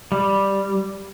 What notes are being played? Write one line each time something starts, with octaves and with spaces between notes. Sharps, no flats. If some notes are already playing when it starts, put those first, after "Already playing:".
G3